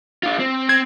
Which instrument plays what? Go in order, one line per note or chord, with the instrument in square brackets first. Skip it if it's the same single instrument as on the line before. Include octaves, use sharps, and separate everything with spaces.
[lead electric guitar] D4 F4
C4
[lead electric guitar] C4 [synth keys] G#6